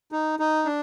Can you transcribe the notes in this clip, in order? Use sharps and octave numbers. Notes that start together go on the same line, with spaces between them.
D#4
D#4
D4